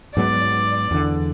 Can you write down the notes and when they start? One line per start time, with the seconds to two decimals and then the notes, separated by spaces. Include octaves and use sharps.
0.17 G#2 F#3 B3 D5
0.91 E2 D3